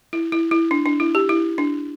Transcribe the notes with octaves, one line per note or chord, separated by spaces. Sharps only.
E4
E4
E4
D4
D4
E4
G4
E4
D4